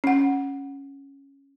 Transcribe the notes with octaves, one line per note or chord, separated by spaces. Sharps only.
C#4 F#5